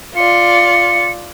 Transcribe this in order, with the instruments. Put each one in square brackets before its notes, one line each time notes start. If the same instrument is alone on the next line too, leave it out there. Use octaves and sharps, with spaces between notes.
[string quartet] F4 D5 [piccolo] C#7